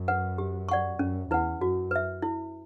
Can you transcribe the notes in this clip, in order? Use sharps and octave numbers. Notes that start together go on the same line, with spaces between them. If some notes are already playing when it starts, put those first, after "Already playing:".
Already playing: F#2
B4 F#5
G4
D5 F#5 C#6
F#2 C#4
E2 E4 B4 F#5
F#2 F#4
B4 E5
E4